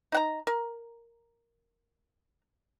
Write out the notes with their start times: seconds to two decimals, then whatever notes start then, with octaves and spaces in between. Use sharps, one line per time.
0.12 D#4 F#5 A#5
0.47 A#4